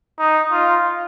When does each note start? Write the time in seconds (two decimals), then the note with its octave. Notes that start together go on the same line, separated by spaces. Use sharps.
0.19 D#4
0.52 F4